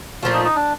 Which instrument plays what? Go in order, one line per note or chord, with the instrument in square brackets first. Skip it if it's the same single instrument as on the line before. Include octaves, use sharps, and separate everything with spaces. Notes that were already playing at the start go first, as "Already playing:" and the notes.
[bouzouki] A#2 F3 A3 [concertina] F4
[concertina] D#4
D#4
D4